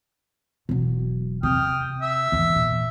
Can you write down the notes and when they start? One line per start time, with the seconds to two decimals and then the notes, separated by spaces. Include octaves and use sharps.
0.69 E1 F#3
1.43 C3 G5 D#6 F6
2.01 E5
2.32 E2 G#2
2.56 A#2